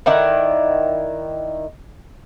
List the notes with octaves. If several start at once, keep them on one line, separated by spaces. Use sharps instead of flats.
D#3 E4 D5 F#5